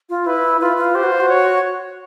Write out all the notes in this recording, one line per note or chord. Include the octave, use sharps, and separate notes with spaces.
F4
E4 B4
F4 B4
F4
G4 C5
F#4
F4
F#4
C#5